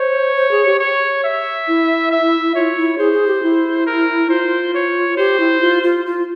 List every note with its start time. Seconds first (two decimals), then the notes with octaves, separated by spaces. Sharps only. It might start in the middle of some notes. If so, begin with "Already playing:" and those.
Already playing: C5 C#5
0.36 C5
0.51 G#4
0.66 G4
0.80 C#5
1.24 E5
1.68 E4
2.11 E5
2.55 F4 C#5
2.77 E4
2.98 G#4 C5
3.13 G#4
3.28 G4
3.43 E4
3.87 A#4
4.30 F4 C5
4.74 C#5
5.17 G4 C5
5.40 E4
5.61 F4
5.83 F4
6.06 F4